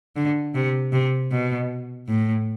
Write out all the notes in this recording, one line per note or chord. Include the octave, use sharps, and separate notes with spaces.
D3
C3
C3
B2
A2